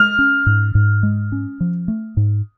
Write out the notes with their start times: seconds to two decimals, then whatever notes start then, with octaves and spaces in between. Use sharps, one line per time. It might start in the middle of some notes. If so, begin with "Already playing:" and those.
Already playing: G#3 F6
0.19 C#4
0.46 G#2
0.75 G#2
1.03 G#3
1.32 C#4
1.60 F3
1.88 A3
2.17 G#2